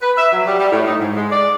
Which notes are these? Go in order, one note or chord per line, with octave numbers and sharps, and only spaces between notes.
B4
E5
F#3
G3
G3
A2
D#4
G#2
G#3
D5